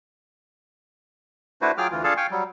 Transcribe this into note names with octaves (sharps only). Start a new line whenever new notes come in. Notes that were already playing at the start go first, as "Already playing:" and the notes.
A3 D4 E4 F#4 B4 C5
F#3 F4 G#4 G5 D6 F6
D2 E3 F4
D4 F4 G#4 A4 F5 A5
F5 G5 G#5 C#6
F#3 G3